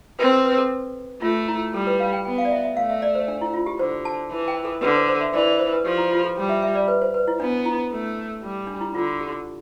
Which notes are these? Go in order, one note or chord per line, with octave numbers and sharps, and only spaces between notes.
C4 B4
A4
B4
A4
A3 F4
E4
G3 A4
B4
F5
G5
B3 G5
F5
D5
E5
E5
A3 F5
E5
D5
C5
D4
E4
F4
G4
D3 C5
A5
E3
G5
A4
D3 B4
C5
C5
E5
E3 D5
D5
C5
B4
F3 G4
E4
F4
A4
G3
E5
E5
D5
B4
C5
B4
E4
B3 D4
E4
A3
G3
D4
E4
D3 F4
G4